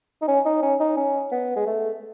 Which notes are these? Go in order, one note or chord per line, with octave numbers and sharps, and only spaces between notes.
D#4
C#4
D#4
C#4
D#4
C#4
B3
G#3
A3